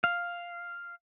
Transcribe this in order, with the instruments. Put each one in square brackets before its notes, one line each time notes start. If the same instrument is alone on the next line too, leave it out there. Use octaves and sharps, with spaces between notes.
[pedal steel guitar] F5